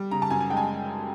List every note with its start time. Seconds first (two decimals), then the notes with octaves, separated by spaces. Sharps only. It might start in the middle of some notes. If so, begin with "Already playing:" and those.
Already playing: G3
0.11 C#3 A#5
0.22 A5
0.30 F#2 G#5
0.41 G#5
0.50 G#3 G5
0.57 G#5